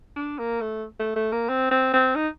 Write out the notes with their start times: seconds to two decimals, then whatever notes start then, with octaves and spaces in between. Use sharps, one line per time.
0.16 D4
0.39 A#3
0.61 A3
0.99 A3
1.16 A3
1.32 A#3
1.49 C4
1.71 C4
1.94 C4
2.16 D#4